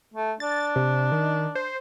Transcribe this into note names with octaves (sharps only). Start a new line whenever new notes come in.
A3
D4 A6
C3
D#3
C5